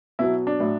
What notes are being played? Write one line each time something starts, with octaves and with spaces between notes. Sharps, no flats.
B2 F#3 E4
D4
A2 F#3